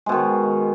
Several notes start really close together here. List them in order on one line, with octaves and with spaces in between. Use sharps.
G#3 B2 D#3